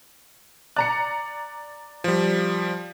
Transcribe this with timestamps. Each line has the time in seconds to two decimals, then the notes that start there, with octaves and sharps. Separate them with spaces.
0.76 D5 A#5 F#6 C#7
2.04 F3 G3